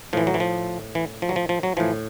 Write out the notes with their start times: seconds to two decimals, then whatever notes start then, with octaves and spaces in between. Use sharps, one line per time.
0.13 A2 E3 F3
0.27 F#3
0.34 E3
0.40 F3
0.95 E3
1.22 F3
1.29 F#3
1.36 F3
1.49 F3
1.63 F#3
1.77 A2 E3 F3